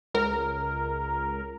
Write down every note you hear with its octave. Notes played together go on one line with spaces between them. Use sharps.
C#2 A#4